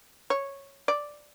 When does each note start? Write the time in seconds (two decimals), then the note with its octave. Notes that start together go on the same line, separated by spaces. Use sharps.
0.30 C#5
0.88 D5